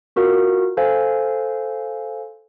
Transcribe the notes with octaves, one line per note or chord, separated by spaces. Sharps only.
F4 F#4 A#4 F5
A4 C5 F5 G#5